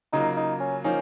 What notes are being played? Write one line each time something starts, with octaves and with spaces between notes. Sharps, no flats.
C#3 F#3 A#3 D#4 F4
D#4
C#4
F3 A#3 C#4 D#4